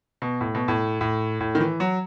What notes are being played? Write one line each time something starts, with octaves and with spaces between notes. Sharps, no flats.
B2
A2
B2
A2
A2
A2
D#3
E3
F#3